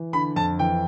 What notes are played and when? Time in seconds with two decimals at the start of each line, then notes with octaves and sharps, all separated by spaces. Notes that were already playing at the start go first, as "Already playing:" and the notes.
Already playing: E3
0.13 D3 B5
0.36 F2 A5
0.59 E3 G5